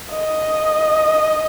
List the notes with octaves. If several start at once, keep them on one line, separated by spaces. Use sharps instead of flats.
D#5